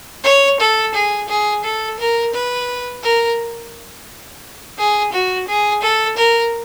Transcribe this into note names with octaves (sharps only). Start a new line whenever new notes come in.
C#5
A4
G#4
G#4
A4
A#4
B4
A#4
G#4
F#4
G#4
A4
A#4